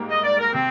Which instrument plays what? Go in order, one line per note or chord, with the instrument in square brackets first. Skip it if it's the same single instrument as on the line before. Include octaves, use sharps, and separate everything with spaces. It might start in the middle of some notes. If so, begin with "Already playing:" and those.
Already playing: [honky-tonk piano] G#2 G3 A#3
[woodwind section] D#5
D5
A#4
[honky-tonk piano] C3 [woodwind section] C4